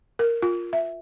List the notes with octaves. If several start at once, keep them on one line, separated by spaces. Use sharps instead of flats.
A#4
F4
E5